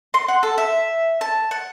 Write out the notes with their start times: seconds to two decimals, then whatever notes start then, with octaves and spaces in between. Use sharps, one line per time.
0.14 C6
0.28 F#5
0.43 A4
0.58 E5
1.21 A5
1.51 F#5